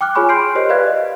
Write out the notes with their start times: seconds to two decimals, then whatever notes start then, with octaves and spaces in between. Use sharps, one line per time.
0.01 G5 D6 F6 F#6
0.15 F4 G#4 C#5 G#5 B5 C#6
0.29 C6 F6 G6 C7 D7
0.55 G4 A#4 C5 C#5 D#5
0.70 B4 D5 E5 F5 F#6 G#6
0.87 D#5